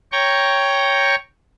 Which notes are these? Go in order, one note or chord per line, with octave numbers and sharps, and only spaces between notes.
C#5 G5 A#5 C#6